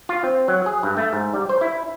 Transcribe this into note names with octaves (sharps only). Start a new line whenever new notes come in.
F4
C4
F#3
G#4
G2
A3
G#2
G3
C5
E4